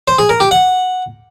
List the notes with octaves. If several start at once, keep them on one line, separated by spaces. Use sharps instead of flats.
C5
G#4
A#4
G4
F#5